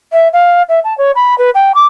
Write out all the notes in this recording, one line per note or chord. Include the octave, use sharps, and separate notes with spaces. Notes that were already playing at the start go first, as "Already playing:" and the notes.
E5
F5
E5
A5
C#5
B5
B4
G5
D6